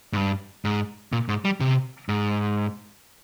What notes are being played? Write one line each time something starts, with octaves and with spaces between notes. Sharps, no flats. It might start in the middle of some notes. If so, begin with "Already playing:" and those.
G#2
G2
G#2
A#2
G#2
G3
C3
G#2